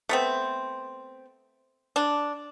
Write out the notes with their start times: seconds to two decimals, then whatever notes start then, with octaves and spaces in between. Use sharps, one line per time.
0.09 A3 B3 C4
1.96 D4